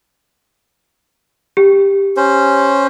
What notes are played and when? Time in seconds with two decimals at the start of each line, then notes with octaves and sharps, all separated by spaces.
1.57 G4
2.17 C#4 C5